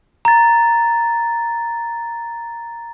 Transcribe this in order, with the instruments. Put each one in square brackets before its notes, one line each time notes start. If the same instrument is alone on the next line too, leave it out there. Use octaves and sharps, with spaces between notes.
[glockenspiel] A#5 A6